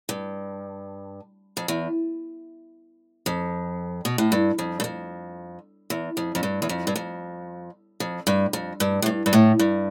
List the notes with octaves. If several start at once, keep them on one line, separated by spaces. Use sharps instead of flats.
G2
F2
E2
F2
B2
A2
G2
F2
G2
F2
E2
F2
F2
G2
E2
F2
G2
F2
F2
G2
F2
G2
A2
G2
G2
A2
G2